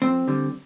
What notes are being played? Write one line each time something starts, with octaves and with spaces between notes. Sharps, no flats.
F2 C4
D3 G3